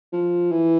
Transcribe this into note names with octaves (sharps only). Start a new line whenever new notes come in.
F3
E3